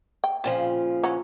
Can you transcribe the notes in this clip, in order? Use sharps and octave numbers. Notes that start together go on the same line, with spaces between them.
G5
A#2 C#3 F3 C4
E3 F#3 C#4